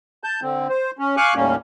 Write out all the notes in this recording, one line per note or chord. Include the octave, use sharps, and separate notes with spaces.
A5 G6
D3 C4
C5
C#4
F5 G#5 C#6 D6 F#6
D#2 A2 G3 A#3 C#4